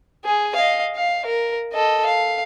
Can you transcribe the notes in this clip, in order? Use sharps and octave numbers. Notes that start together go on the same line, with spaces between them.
G#4
D#5 F5
F5
A#4
A4 D#5
F5